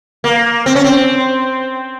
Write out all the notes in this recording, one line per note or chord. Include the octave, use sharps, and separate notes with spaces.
A#3
C4
C#4
C4